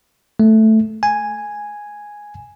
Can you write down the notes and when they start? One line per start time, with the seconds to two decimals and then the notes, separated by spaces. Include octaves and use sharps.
0.40 A3
1.03 G#5